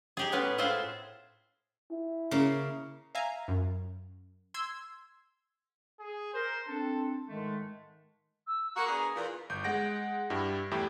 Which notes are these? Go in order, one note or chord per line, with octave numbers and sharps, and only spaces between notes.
D#4 G4 G#4
A2 G#3 B3 C#4 B4
A2 F4 G#4 C5 E5 F#5
E4
C#3 A#3
E5 F5 G#5 A#5
F#2
C6 E6 G#6
G#4
A#4 C5
C4 D4 A4
G#2 D#3 G#3 A3
E6
A#3 F#4 A#5
B3 D4 G#4
E2 A#2
G1 G6
G#3 F#5 A#6 D7
G2 G3 E4
E2 A2 E4 G4